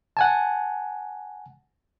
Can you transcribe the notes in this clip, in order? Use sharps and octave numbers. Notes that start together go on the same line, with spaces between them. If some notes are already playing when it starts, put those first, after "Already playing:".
F#5 G#5 A5